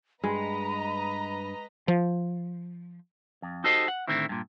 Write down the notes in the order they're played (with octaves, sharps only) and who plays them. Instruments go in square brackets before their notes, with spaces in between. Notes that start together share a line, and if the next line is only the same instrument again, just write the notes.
[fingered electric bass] G2 [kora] G#3 [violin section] B4 D#5 A#5 [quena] B5
[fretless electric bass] F3
[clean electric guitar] F2
D#4 F#4 G4 A4 C5 D#5
F#5
A2 D3 D#3 C4 E4
G2 A#2